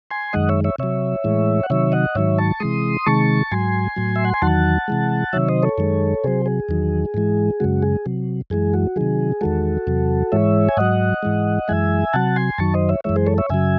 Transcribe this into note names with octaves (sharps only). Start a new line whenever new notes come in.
G#5 C6
F#2 D#3 G#3 D#5 F#5
C#5 E5
C#5 E5
C3 F#3 C#5 E5
A2 E3 G#3
F#5
C3 D#3 F#3 C#5 E5
D#5 F#5
G#2 D#3 F#3 C#5 E5
A5 C#6
C3 E3 G#3 C6 D#6
C3 D#3 G#3 A5 C#6
G#2 F#3 G#5 C6
A2 F#3
E5
F#5
G#5
E2 D#3 F#3 F#5 A5
C3 E3 G#3
C3 D#3 F#3 C#5 E5
C5 D#5
A4 C#5
F#2 D#3 G#3
C3 F#3 G#4 C5
G#4
E2 D#3 F#3
G#2 E3 G#3
F#2 C#3 G#3 F#4
G#4
C3 F#3
F#2 E3 G#3 G#4
F#4
C3 D#3 F#3 G#4
E2 D#3 G#3 F#4 A4
E2 C3 F#3
G#2 E3 G#3 C#5 E5
G#5
G#2 F#3 D#5 F#5
G#2 E3 G#3
F#2 E3 G#3 E5 G#5
C3 F#3 F#5 A5
G#5 C6
F#2 D#3 F#3 A5 C#6
C5 D#5
C#5 E5
F#2 E3 G#3 C#5 E5
G#4 C5
A4 C#5
C#5 E5
F#2 C#3 F#3 E5 G#5